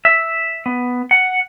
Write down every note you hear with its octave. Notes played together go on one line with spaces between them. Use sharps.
E5
B3
F#5